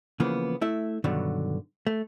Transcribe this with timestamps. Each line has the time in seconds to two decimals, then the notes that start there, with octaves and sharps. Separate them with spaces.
0.20 C#3 E3 F3 A#3 B3
0.61 A3 E4 E5
1.04 G2 B2 D3 D#3 F#3
1.87 A3